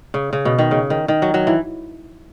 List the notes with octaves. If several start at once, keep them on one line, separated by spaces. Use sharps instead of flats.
C#3
C#3
B2
D#3
C#3
D#3
D#3
F#3
F#3
E3